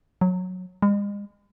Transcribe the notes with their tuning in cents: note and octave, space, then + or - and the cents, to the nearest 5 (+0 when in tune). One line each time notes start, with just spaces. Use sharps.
F#3 -15
G#3 -40